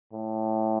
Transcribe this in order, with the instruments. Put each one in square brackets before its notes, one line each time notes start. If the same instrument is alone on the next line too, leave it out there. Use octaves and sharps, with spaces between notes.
[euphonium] A2